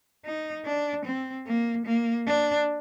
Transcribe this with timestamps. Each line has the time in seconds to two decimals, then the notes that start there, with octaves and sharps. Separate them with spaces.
0.25 D#4
0.66 D4
1.05 C4
1.47 A#3
1.86 A#3
2.27 D4